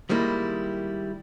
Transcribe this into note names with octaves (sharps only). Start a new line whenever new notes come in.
D#3 G3 G#3 A#3 E4